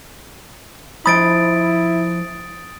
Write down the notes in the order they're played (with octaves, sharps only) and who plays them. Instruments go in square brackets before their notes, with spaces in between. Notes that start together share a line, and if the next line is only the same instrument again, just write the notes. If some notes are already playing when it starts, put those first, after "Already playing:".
[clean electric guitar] F3 B5 [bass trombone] E4 [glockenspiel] D#6 A6 D7